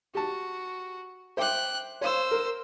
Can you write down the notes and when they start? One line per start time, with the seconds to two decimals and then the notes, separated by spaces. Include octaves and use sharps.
0.15 F#4 G4 A5
1.37 C5 E5 G5 D6 F#6
2.01 C5 C#5 F5 E6
2.31 A#4